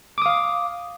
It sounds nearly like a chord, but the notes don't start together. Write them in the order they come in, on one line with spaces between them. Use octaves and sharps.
D6 D#6 F5